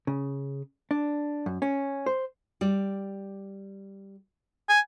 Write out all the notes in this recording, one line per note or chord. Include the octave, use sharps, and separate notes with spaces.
C#3
D4
F#2
C#4
C5
G3 D5
G#5